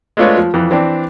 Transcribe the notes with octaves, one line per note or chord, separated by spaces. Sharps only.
G#3 A3 D4 F4 B4 C#5
F3
F2 E3
E3 C4 D4